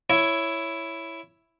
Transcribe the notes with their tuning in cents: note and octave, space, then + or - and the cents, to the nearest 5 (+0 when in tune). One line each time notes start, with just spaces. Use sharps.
E4 +5 C#5 +0